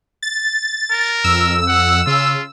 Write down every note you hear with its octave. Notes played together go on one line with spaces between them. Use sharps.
A6
A#4
F2 E6
F#5
C#3 F4